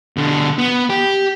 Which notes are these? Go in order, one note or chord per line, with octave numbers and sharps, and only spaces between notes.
B2 D3
B3
G4